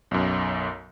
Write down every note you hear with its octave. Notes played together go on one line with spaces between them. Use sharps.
B1 F#2